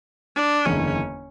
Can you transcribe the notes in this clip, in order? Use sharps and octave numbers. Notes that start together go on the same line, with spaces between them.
D4
F#1 E2 D3 C#4